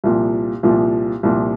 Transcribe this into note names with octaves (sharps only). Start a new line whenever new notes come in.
C2 A#2 F3
C2 A#2 F3
C2 A#2 F3